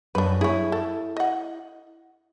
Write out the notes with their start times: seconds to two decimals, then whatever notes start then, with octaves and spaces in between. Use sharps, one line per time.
0.15 F#2 D4 B4
0.41 E4 G#4 C#5
0.72 A4
1.17 D#5 F#5